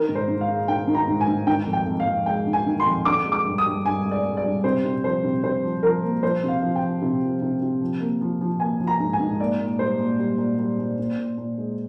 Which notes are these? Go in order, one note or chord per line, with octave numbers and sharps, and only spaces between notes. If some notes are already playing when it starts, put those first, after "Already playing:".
Already playing: D#3 A#4
G#2
C5
G#2
F5
G#3
D#3 G5
D#3
A#5
G#2
G#5
G#2
D#3 G5
F2
G5
F2
F5
F2
G#3 G5
D#3
G#5
D#3
C6
F2
D3 D6
G#3
D6
G2
D#6
G2
G2 G#5
G#3
D5
G#3
D5
G2
C3 C5
C3
F3 C5
C3
C3 C5
F3
F3 A#4
A#3
F3 C5
C3
F5
F3
G5
F3
C3
F3
C3
C3
F3
A#3
F3
F3
A#3 G#5
F3
A#5
G#2
G#5
G#2
A#3 D5
A#2
G3 C5
A#2
G3
A#2
G3
A#2
A#2
A#2
A#2
G#3